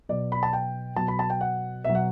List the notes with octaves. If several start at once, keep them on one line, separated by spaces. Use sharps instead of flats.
B2 F#3 D5
B5
A5
G5
B2 F#3 A5
B5
A5
G5
F#5
B2 F#3 E5
F#5